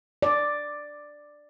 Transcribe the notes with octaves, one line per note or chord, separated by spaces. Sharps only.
D5